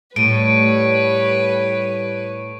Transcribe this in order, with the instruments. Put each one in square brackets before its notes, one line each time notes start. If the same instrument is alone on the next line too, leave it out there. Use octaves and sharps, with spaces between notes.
[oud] A2 [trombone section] G3 [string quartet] B4 C#5 [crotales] D7 D#7